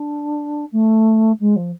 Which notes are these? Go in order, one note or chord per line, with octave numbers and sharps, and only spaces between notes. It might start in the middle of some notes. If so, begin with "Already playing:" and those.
Already playing: D4
A3
G#3
F3